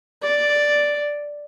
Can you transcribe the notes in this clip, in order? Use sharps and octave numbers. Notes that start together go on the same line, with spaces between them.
D5